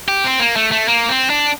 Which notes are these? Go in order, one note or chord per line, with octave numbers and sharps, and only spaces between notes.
G4
C4
A#3
A3
A3
A#3
C4
D4